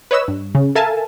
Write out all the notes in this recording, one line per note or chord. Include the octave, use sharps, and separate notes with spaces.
B4 C#5 D#5 E6
G2
C#3
A4 A#4 E5 F5 G#5 A5